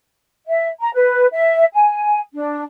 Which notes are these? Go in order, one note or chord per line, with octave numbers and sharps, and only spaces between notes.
E5
A#5
B4
E5
G#5
D4